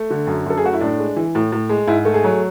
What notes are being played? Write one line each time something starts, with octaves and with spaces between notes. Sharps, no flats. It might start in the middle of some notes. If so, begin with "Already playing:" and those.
Already playing: A3
D3
F#2
F#2 A4
G#4
A3 F#4
E4
A2 D4
G#3
E3
A2
A2
G#3
G#2 E4
A3
G#4
F#3